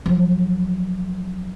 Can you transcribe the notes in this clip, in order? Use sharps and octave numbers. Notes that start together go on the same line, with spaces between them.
F3 F#3